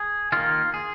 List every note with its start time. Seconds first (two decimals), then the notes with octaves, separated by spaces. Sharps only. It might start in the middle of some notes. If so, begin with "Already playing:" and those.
Already playing: G#4
0.32 D#3 A#3 F4
0.74 G#4